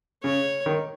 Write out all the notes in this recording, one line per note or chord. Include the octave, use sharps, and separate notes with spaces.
C#3 C#5
D#3